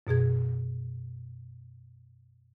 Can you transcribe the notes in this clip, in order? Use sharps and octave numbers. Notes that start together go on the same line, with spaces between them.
F#2 B2 G#4 G#6